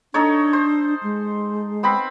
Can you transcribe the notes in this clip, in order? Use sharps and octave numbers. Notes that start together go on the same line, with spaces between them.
D4 D#4 A4 C#5
C5
G#3
B3 C4 B5